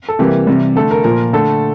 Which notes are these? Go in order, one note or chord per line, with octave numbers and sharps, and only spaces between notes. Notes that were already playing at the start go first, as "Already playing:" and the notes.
A4
C3 E3 G3 A#3 G4
C3 E3 G3
D3 A3 A4
A#4
A#2 F3 A#3 A#4
D3 A3 A4